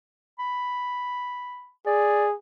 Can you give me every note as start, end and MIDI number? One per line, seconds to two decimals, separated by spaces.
0.39 1.70 83
1.86 2.35 68
1.86 2.25 74